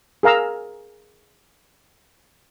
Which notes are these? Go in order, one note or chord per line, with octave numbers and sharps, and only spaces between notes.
G#4 A#4 F5 A#5 E6